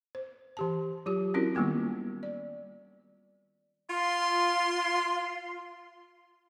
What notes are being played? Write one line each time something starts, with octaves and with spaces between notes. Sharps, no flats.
C5
E3 G4 A5
F#3 F4 G4
C4 C#4 E4 F#4 A#4
D#3 G3 A#3 B3 F4
D5
F4 C6